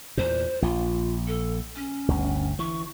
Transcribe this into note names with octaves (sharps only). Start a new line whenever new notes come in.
E2 A#2 C5
A#1 F4
A4
C#4
G1 D2
E3 C#6